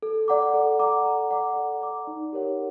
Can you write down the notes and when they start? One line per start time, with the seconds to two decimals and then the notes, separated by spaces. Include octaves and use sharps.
0.03 A4
0.28 D5 F#5 A#5 D6
0.54 A4
0.79 D5 F#5 A#5 D6
1.05 A4
1.31 D5 F#5 A#5 D6
1.56 A4
1.81 D5 F#5 A#5 D6
2.07 D#4
2.33 G4 A#4 C#5 F#5